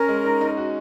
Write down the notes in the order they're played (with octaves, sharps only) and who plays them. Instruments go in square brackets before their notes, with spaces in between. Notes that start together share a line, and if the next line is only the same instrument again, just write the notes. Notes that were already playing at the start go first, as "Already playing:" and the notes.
Already playing: [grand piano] C#4 [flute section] A#4
[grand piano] G#3
D#4
D#4
F#4